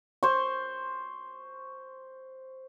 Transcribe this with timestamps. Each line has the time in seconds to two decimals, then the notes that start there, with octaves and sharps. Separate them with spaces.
0.23 C5 C#6